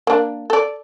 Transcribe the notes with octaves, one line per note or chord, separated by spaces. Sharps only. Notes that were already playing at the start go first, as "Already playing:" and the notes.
A#3 D4
A4 D5